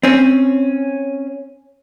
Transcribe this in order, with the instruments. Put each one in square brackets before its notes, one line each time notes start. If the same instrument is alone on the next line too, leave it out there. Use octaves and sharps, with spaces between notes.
[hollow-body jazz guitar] C4 C#4